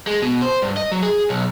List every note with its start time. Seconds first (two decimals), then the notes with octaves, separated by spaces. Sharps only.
0.07 G#3
0.22 B2
0.42 C5
0.62 G2
0.77 D#5
0.92 F#3
1.03 G#4
1.30 B1